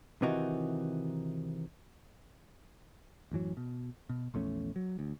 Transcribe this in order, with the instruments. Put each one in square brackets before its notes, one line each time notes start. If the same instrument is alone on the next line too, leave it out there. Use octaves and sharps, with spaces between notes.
[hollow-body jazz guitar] C3 D#3 E3 D#4 F#4
[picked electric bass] A1 F#2 E3 F#3
B2
B2
A#1 E2 A3 C#4
F#3
D2